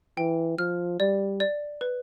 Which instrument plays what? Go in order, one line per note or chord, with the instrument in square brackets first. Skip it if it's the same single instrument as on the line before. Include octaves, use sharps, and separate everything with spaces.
[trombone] E3 [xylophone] G5
[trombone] F3 [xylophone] F6
[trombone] G3 [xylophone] D5
[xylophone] D5
B4